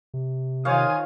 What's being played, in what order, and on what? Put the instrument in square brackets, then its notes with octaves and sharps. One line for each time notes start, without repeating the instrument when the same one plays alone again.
[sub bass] C3
[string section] D#3 F4 [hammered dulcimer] C5 C#5 F5 [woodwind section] G#5 D#6